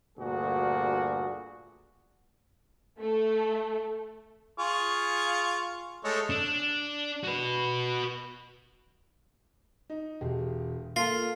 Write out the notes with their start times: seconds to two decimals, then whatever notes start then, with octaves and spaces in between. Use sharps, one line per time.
0.18 D2 G2 A#2 D4 F#4 G#4
3.00 A3
4.59 F4 G#4 C#6
6.04 G#3 A3 C#5
6.30 D4
7.23 F#4 B4
9.90 D#4
10.21 E1 G4 G#4
10.96 A#3 F4 A4